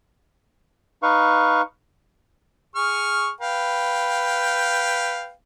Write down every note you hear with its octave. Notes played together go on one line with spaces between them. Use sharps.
D#4 B4 F5 C#6
G#4 C#6 F6
B4 F5 G5